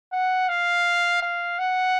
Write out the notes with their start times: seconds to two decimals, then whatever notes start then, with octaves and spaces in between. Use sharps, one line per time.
0.12 F#5
0.49 F5
1.22 F5
1.59 F#5